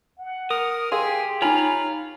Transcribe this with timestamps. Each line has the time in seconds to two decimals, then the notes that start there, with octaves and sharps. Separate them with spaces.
0.18 F#5
0.51 A#4 D#6
0.92 G4 G#4 A#4 F5 C6
1.42 D#4 F4 C#5 G#5 A#5 B5